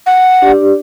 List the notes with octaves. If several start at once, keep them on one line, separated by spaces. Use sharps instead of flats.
F#5
D4 G4 D5